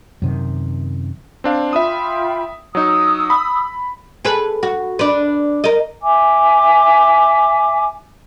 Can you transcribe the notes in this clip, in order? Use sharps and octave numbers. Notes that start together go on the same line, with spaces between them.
F#2 C3 D#3
C4 D4 F5
F4 E5 G5 B5 D#6
F#3 D#4 D#6 E6
B5
G#4 A4 B4
F#4
D4 B4
A#4 D#5
E5 G#5 D6